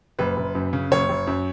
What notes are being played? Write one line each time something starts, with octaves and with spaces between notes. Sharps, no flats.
F#1 B4
F#1
F#2
C#3
F#1 C#5
F#1
F#2